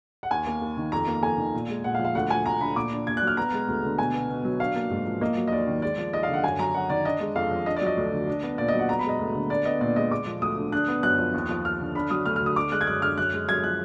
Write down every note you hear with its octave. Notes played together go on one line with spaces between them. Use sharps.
F#5
D#2 G#5
A#3
D#2
D#3
F2 A#5
A#3
F2 G#5
D#3
A#2
G#3
A#2 F#5
F5
F3
F5
D2 F#5
F3 G#5
D2 A#5
D3 B5
A#2 D6
D4
A#2 G#6
F#6
F#3
F6
B3 A#5
G#3
D2
D3
B2 G#5
B3
B2
F#3
D4 F5
A#3
G#2
F3
A#3 D#5
F#3
D#5
D#2 D5
D#3
G#3 D5
F3
D#2 D#5
F5
D3
F#5
F#2 G#5
F#3 A#5
F#2 F#5
D#3 D5
D4 D#5
G#3
F2 F5
F3
D4 D#5
D5
F#3 D#5
D2
D3
D4
B3
A#2 D5
D#5
F#3
F#5
B3 A#5
B5
G#3 D#5
D2
D3
D4 D5
B3 D#5
A#2 D5
G#3 D#5
G#3 D6
F3
D2 D#6
D3
D4 F#6
B3
F#2 F#6
F3
D#2
F3
D#2 F6
D3
D4 B5
F#3 D#6
D2 F6
F6
D3 D#6
D4 D6
G#3 F#6
G#6
F#2 F#6
D3 F6
F#2 F#6
G#3
F#2 G#6
F3 F#6